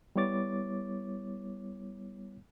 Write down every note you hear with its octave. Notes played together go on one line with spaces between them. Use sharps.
G3 B3 E4 C#5 D6 A6